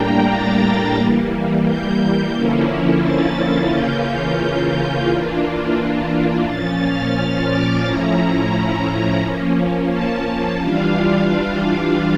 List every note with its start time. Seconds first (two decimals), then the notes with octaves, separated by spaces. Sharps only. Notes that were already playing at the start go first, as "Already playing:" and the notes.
Already playing: A2 G3 A#3 D4 G5 A#5
0.28 A6
0.97 E3 G3 A#3
1.65 G6
2.34 D3 F3 A#3 C#4 E4
3.03 A6
3.37 A6
3.71 C#3 E3 A#3 C#4 F4 G6
5.08 E3 A#3 D4 F4
6.46 A#2 F3 C#4 A6
6.80 F6
7.15 F6
7.49 D6
7.83 A2 F3 C#4 E4 A#5
8.17 A#5
8.51 A#5
9.20 F3 A#3 C#4
9.90 A5
10.57 E3 G3 D4 F4 F5